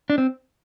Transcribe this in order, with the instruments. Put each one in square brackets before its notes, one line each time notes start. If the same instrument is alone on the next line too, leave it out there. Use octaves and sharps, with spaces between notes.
[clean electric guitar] D4
C4